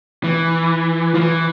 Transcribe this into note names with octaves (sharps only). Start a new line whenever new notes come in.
E3
F3
E3